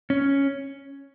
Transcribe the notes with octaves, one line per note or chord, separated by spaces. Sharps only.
C#4